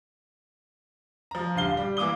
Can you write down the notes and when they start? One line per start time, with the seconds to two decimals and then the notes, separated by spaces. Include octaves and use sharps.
1.31 F3 A#5
1.55 D#1 D3 F5 G7
1.77 G3
1.97 E3 A#3 D6 D#6 G7